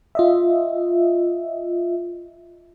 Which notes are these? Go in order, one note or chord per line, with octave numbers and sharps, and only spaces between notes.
F4 D#5 E5